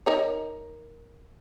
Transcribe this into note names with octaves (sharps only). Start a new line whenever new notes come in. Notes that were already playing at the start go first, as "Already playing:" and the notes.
D#4 A#4 C#5